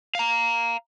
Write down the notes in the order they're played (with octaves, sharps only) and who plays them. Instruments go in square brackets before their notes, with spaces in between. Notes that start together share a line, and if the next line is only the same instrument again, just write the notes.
[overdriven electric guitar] F5 A#5